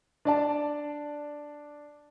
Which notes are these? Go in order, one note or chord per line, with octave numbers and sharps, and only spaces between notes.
D4 D5 A5